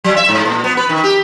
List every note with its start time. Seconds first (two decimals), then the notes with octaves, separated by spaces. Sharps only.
0.04 F#3
0.16 E5
0.29 G#2
0.45 A#2
0.64 B3
0.77 B4
0.89 D#3
1.04 G4